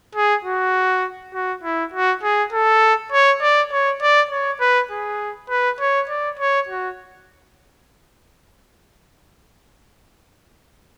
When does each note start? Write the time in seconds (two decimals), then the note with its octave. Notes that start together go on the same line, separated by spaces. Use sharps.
0.15 G#4
0.44 F#4
1.34 F#4
1.64 E4
1.94 F#4
2.23 G#4
2.53 A4
3.12 C#5
3.42 D5
3.72 C#5
4.02 D5
4.31 C#5
4.61 B4
4.91 G#4
5.50 B4
5.80 C#5
6.10 D5
6.39 C#5
6.69 F#4